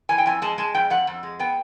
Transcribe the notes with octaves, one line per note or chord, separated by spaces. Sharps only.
E3 G#5
G5
F2 G#5
G#3 A5
G#3 A5
F2 G5
F2 F#5
F2
G#3
B3 G5